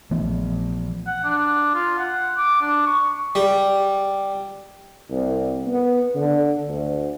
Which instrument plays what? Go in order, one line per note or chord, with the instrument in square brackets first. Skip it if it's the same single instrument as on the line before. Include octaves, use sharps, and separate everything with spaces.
[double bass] A#1 [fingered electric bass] E3 A3 B3
[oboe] F#5
D4
F4
F#5
D6
D4
C#6
[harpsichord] G3
[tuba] C2
B3
D3
D2